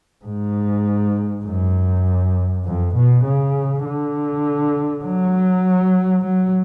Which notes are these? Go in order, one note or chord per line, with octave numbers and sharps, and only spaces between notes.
G#2
F#2
F2
B2
C#3
D3
F#3
F#3